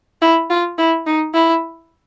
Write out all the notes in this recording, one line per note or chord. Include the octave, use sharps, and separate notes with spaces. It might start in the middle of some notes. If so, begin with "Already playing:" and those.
E4
F4
E4
D#4
E4